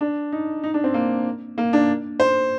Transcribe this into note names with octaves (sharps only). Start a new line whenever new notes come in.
D4
D#4
D#4
D4
C4
A#3
A#3
D4
C5